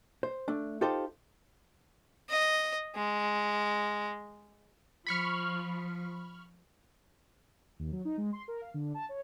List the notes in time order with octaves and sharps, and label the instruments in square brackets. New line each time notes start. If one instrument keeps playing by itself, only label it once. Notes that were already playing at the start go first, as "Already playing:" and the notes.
[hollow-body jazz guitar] C5
A3 D4
D#4 F4 G4 A4 C5
[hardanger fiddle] D#5
G#3
[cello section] F3 [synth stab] B5 C#6 F6
[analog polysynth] D#2
F#3
D#4
G#3
C6
A#4
F5
D3
A5
C#5